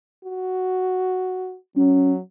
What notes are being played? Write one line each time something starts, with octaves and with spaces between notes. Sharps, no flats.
F#4
F#3 C#4